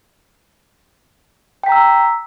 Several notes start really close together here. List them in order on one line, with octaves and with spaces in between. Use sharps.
G5 B6 A#5 E6